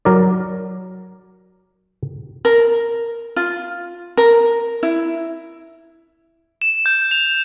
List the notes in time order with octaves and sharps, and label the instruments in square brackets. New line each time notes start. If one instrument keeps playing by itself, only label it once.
[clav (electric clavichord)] F#3 A#4 D5
[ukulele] A#4
F4
A#4
E4
[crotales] E7
G6
F7